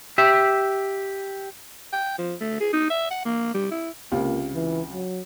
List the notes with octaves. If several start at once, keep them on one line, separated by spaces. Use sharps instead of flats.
G4 E5
G5
F3
A3
G#4
D#4
E5
F#5
A#3
G3
E4
C#2 C3 A#3 F4
E3
F#3